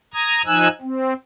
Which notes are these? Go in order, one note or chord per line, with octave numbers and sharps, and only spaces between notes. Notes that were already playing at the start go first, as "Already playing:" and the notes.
A#5 D#6 G#6
F3 D#4 G#5 E6 F#6
C4